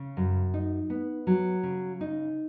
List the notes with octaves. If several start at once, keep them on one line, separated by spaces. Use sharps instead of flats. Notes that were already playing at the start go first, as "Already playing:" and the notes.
Already playing: C#3
F#2
D#4
B3
F#3
C#3
D#4